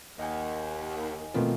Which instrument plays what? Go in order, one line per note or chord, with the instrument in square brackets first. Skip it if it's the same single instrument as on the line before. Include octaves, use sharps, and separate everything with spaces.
[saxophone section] D#2 [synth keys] D#5 F#5 G#5
[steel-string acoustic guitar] B2 D#3 F3 [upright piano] A3 C4 F4